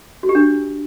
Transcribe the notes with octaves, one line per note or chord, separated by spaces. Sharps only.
F#4
G4
D4